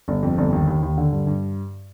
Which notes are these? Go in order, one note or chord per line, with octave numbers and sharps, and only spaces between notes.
G1
F2
G1
D#2
D#2
D#2
D3
G2
G2